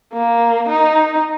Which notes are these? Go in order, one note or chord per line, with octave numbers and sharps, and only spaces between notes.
A#3
D#4